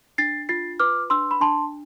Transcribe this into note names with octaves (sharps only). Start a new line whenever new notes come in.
D4 A6 C7
F4 A6 C7
B4 D6 F6
D4 C6 E6
B5
D4 A5 C6